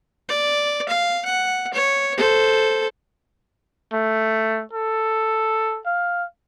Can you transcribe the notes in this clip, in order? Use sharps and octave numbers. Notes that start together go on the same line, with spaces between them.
D5
F5
F#5
C#5
A4 C5
A3
A4
F5